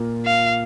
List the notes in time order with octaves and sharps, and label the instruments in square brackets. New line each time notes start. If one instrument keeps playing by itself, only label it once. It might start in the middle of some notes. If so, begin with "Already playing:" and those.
Already playing: [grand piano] A#2 A#3 F4
[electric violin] F5